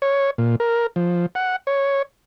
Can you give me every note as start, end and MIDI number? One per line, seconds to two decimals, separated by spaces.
0.02 0.31 73
0.38 0.56 46
0.60 0.87 70
0.96 1.26 53
1.35 1.56 78
1.67 2.02 73